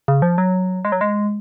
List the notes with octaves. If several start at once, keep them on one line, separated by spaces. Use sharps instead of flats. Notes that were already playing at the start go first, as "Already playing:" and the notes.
C#3
F3
F#3
G#3
F#3
G#3